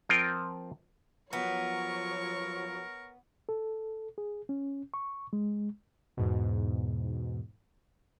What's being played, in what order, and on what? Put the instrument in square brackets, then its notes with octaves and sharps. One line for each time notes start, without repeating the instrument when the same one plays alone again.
[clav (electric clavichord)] F3 C4 F4 A#4 G5
[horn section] F3 F#3 [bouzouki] B3 [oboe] A#4 [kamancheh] C#5 C#6
[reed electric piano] A4
G#4
C#4
C#6
G#3
[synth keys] E2 G#2 B2